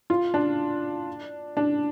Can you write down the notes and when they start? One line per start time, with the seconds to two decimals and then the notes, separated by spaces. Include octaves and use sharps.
0.10 F4
0.34 D4
1.57 D4